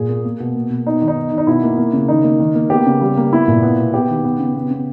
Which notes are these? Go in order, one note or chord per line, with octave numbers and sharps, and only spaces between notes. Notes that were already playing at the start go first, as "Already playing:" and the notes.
Already playing: A#2 G#4
A#3
A#3
B2
A#3
B2
B3 D#4
D#3
D#4
B3
D#3
D#4
B2 E4
A#3
A#3
C#3
D#3 D#4
A#3
D#3
A#3
B3 G4
C#3
G3
A#3
B3 E4
A#2
B3
B2
B3 G4
D#3
B3
C#3
B3
C#3